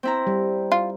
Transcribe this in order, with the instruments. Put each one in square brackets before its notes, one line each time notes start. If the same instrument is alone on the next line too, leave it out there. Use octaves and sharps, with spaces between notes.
[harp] C4 E4 A#5
[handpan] G3
[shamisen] F4